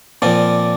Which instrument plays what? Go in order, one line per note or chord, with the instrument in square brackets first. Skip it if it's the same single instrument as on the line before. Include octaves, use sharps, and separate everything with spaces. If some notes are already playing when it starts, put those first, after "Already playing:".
[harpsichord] A#2 F3 C4 [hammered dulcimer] D5